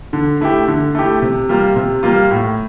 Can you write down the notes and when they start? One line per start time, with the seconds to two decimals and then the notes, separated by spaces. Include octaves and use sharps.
0.13 D3
0.41 A3 E4 G4
0.68 D3
0.95 A3 E4 G4
1.22 C3
1.49 G3 A#3 F4
1.76 C3
2.03 G3 A#3 F4
2.31 A2